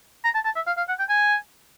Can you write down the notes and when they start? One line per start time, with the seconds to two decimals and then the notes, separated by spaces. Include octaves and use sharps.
0.25 A#5
0.35 A5
0.45 A5
0.56 E5
0.67 F5
0.77 F5
0.89 F#5
0.99 G5
1.10 G#5